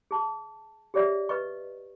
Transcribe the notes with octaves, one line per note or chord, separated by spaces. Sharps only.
G#4 A5
G4 G#4 C#5 D5 E5
B4 D#5 C#6